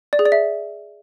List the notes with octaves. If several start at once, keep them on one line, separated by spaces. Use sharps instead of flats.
D5
G#4
D5
E5